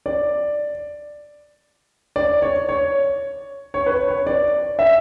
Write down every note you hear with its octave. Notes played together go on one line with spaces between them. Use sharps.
D5
D5
C#5
C#5
C#5
B4
C#5
C#5
D5
E5